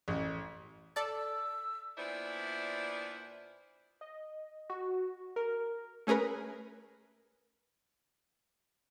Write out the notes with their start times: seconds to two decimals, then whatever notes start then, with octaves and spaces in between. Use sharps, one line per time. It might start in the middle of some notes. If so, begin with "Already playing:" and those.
0.08 A1
0.96 A4 D5 A5 E6
1.98 A#2 B3 D4 E4 C5 D5
4.01 D#5
4.70 F#4
5.36 A#4
6.07 A3 C#4 G#4 A#4 B4